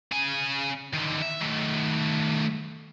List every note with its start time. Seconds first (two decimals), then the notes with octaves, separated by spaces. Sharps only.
0.12 C#3 G#5
0.94 D3 D#3
1.22 E5
1.41 D#3 A3